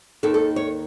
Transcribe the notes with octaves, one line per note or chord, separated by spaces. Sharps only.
D#2 D#3 A4
A4
C#5